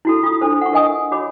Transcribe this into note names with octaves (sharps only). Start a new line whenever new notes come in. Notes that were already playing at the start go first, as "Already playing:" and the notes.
E4 F#4 A4
F4 D#6
D4 A4 C5
F#5 C#6
A#4 D#5 G#5 D#6
F#4 C#5 B5 D6